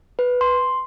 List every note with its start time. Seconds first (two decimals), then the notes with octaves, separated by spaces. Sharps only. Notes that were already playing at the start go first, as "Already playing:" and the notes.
0.19 B4
0.41 C6